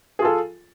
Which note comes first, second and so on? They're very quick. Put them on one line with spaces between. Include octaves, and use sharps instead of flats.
G#4 F4 A4